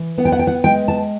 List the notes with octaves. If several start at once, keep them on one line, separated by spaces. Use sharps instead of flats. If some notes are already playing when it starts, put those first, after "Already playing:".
Already playing: E3
B3 F#5
G5
F#5
G5
F#5
G#3 G5
A5